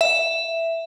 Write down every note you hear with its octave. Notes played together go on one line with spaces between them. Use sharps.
E5